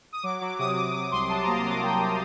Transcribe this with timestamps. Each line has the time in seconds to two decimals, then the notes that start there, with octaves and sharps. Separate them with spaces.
0.13 D#6
0.23 F#3 D6
0.41 F#3 D6
0.59 C3 D#6
0.76 F#3 D6
0.94 F#3 D6
1.12 C2 C6
1.29 F#3 A5
1.43 A#3 A#5
1.56 C6
1.65 F#3 D6
1.82 A#3 G5
2.00 C3